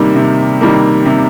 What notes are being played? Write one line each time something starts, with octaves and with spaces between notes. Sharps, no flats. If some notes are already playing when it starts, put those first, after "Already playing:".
Already playing: C3 D#3 G3 A#3
C3
D#3 G3 A#3
C3